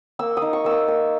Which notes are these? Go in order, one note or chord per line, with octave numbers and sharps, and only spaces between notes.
A#3 E6
D#6
D#4
C#6
A#3 E6
D#6
A#3 E6